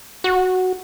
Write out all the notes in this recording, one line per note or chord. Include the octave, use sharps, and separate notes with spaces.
F#4